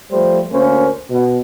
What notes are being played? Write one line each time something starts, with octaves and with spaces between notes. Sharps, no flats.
F3 G3 A3 C5
D2 A#3 C#4 C5
B2